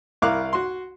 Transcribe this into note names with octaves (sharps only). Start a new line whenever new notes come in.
C2 E4 A#4 F5 D6 F#6
F#4 C6